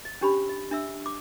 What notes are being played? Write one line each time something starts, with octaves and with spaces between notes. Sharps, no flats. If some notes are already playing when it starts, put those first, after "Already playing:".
D#5
C#4 D4 G4 C5 B5
D#5
D4 E5 E6
D6